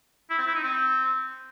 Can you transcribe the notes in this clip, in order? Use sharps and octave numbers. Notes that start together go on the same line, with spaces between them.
E4
C4
E4
D#4
C4